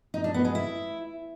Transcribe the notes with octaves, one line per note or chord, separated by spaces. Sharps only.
D#4
D4
B3
G#3
E4